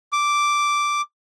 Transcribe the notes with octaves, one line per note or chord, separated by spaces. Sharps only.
D6